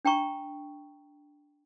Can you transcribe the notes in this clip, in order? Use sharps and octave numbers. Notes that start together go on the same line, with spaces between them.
D4 G5 A#5 C#6